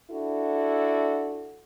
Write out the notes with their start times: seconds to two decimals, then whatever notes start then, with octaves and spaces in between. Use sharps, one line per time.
0.11 D4 E4 F#4 A4